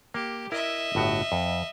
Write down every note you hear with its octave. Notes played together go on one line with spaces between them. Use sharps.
A#3 G4
E4 A#4 D#5 E5
G1 A2 F#4
F2